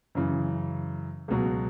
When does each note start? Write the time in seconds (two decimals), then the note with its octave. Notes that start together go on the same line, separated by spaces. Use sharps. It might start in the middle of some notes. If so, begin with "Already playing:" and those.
0.15 F#2 C#3 E3
1.28 C#2 B2 F#3